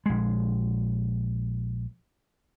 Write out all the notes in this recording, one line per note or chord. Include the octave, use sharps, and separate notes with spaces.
A#1 G#3